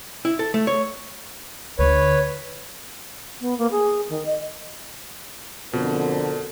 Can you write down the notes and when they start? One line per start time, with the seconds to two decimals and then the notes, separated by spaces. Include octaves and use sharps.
0.25 E4
0.39 A4
0.54 A3
0.67 C#5
1.79 D2 D3 B4 C#5
3.41 B3
3.58 A#3
3.71 G#4
4.09 D#3
4.26 D#5
5.73 F2 B2 D3 A4 A#4 C5